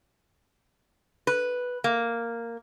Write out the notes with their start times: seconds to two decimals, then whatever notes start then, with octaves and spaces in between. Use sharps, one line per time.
1.27 B4
1.84 A#3